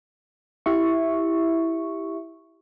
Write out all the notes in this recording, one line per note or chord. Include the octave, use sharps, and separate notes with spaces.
E4 G4 E5 C#6